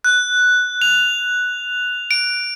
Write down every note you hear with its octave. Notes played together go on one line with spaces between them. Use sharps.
F#6
F7
D7